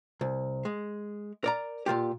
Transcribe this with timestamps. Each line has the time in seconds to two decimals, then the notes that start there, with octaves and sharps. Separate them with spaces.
0.21 C2
0.65 G#3
1.44 A#4 D5 A#5
1.86 A#2 D#3 F4 G4